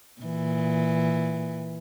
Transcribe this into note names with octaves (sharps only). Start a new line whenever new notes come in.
A#2 E3